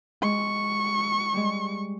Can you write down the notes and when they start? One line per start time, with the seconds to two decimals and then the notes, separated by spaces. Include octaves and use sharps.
0.22 G#3 C#6
1.34 G3 G#3